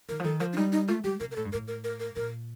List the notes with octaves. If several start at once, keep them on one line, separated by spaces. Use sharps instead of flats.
D#3 A#4
F3
D#3 A4
F3 A#4
D4
G3 D#4
D#4
A3 F4
G3 G4
C3 A#4
A#4
A2 A4
G2
A2 A#4
A#4
A#4
A#4
A#2 A#4